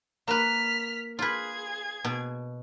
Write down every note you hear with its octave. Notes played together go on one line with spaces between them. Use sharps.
A#3 B4 F6 B6
F4 G#4 B4 G#6
B2